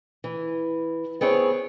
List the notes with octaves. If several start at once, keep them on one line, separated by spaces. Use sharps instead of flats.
E3
B3 C4 G#4 C#5